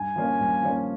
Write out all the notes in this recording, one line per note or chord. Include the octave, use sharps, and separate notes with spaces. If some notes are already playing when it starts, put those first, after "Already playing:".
Already playing: G2 G#5
F3 A#3 C#4
G2
F3 A#3 C#4